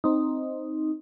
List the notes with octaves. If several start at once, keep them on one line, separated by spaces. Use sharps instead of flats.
C4 D#4